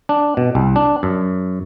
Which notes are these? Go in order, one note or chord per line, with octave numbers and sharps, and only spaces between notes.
D4
B2
C2
D4
F#2